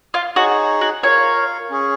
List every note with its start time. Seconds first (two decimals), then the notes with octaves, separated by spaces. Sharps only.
0.14 F4
0.36 D#4 F#4 G#4 C#5
0.81 F#4
1.03 F4 A#4 C#5 F5
1.70 C#4 G#4 C#5